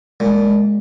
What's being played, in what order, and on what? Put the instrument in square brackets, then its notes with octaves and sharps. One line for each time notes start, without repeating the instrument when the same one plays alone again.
[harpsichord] A#2 [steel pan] G#3
[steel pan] G#3